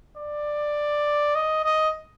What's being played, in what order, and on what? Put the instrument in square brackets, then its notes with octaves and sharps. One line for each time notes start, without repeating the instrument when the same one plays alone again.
[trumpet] D5
D#5
D#5